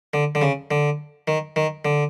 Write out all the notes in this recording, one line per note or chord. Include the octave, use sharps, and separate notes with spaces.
D3
D3
C#3
D3
D#3
D#3
D3